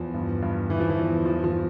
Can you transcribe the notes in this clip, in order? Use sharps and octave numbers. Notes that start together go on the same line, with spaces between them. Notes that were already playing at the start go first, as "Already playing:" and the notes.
Already playing: E2 F3
G2
G2
E3
F3
E3
E2
G2 F3
F3